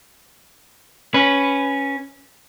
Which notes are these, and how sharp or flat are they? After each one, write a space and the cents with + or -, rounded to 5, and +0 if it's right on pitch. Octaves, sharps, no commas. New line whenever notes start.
C#4 +0 B4 +0